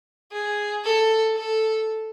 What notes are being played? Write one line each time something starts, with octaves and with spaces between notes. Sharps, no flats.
G#4
A4
A4